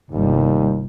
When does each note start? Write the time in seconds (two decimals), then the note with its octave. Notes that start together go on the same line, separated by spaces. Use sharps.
0.12 G1 D#2 C3 G3